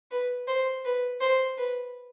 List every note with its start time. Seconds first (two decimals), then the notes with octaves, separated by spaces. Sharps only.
0.11 B4
0.48 C5
0.85 B4
1.21 C5
1.57 B4